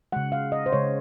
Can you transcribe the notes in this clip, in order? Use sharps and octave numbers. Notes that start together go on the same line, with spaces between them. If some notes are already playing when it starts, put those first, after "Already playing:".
C#3 G#3 F#5
F5
D#5
C5
C#3 G#3 C#5